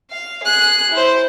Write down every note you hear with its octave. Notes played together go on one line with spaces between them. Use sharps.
F5
G#4 F#6
E4 C5